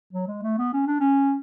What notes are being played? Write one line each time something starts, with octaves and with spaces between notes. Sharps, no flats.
F#3
G#3
A3
B3
C#4
D4
C#4